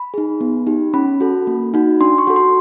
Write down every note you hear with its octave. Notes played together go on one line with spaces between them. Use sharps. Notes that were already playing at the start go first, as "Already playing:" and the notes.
Already playing: B5
D#4 G#4
B3
D#4 G4
C#4 B5
F#4 A4
A#3
D#4 F#4
D4 C6
C#6
F#4 A4
C6